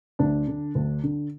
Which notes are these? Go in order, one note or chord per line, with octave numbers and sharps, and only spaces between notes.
D2 D4
D3
D2
D3